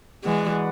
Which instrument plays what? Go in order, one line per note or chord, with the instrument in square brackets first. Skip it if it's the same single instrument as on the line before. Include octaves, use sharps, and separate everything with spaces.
[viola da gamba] E3 G#3 [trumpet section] F#4 B4 D5 F#5